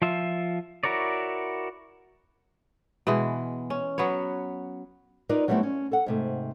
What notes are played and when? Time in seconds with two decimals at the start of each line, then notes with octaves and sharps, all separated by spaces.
0.02 F3 F4 E5
0.84 E4 F#4 A#4 C#5 D5
3.07 B2 E3 G#3
3.70 C#4
3.98 F#3 B3 B4 C#5
5.29 D#4 F4 A#4 B4 D5
5.48 F#3 G3 A3 B3 C4 E4
5.63 C#4
5.92 A4 F#5
6.06 G#2 C3 A3